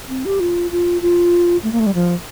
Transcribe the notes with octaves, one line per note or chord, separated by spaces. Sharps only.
C4
G4
F4
F4
F4
A3
A#3
A3
G3
F3